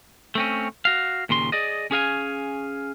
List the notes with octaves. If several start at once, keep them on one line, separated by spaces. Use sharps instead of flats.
A3 C4 C#4
F#4 F5
D#2 A#2 C#3 C6
G#4 D5 D#5
C#4 G#4 F5 G#5